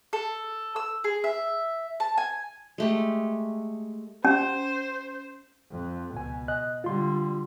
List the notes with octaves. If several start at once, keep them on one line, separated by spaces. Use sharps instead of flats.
A4
E6
G#4
E5
A5
G#5
G#3 A3 G4
C#4 C5
F2
C#2 B2 G#5
D#5 F#6
D3 G3 F4 C6